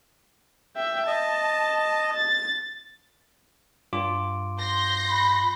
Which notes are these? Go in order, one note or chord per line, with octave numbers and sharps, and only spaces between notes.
E5 G5
D#5 A5
A6
G2 F4 D6
C6 G6 A#6
B5